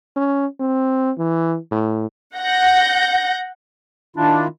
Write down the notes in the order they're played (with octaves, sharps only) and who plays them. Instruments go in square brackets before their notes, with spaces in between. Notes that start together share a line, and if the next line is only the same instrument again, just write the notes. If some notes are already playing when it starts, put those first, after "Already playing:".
[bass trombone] C#4
C4
E3
A2
[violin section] F#5 G6 A#6
[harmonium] D#3 E4 F4 [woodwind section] D4